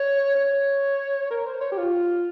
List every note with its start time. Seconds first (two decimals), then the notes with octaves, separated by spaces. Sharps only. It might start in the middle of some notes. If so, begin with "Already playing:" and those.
Already playing: C#5
0.35 C#5
1.30 A#4
1.46 C5
1.61 C#5
1.72 G4
1.78 F4